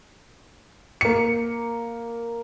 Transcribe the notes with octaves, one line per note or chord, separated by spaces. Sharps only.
A#3 C#7